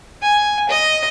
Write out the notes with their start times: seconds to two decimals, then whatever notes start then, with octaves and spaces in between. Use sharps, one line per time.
0.22 G#5
0.69 D#5